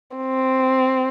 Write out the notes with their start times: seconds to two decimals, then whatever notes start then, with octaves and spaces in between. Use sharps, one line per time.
0.17 C4